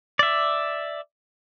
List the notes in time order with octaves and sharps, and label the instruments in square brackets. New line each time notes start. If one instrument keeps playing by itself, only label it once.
[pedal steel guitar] D5 E5